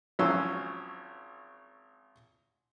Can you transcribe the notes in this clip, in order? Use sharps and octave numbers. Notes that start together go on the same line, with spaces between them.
G#1 F3 F#3 C#4 C6 E6